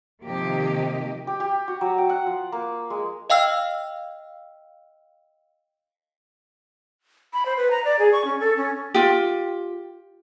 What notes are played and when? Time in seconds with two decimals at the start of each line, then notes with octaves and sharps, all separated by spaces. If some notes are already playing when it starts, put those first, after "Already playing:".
0.24 C3 D#3 F3 A#3 G4 D#5
1.27 G4
1.40 G4
1.68 F#4
1.81 F#3
1.98 G5
2.10 F#5
2.26 F3
2.52 A#3
2.90 G#3
3.30 D#5 F5 G5 E6 F6
7.33 B5
7.46 C5
7.57 B4
7.71 A#5
7.85 D5
7.99 G#4
8.12 C#6
8.25 C#4
8.40 A4
8.57 C#4
8.94 F4 G4